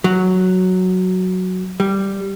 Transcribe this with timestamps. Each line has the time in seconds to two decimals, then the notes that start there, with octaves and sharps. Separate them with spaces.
0.04 F#3
1.80 G3